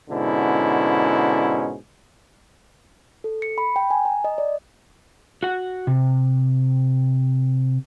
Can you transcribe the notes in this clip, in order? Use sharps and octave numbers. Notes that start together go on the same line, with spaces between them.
G#2 B2 D3 C#4 E4
A4
C#7
B5
G5
G#5
A#5
D#5
D5
F#4 F#5
C3